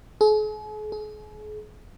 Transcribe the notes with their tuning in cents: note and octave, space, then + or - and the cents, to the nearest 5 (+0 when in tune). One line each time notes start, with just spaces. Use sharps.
G#4 +45
G#4 +40